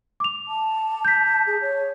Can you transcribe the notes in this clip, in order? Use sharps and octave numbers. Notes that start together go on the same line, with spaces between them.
D6 F7
A5
G6 B6
G#4
C#5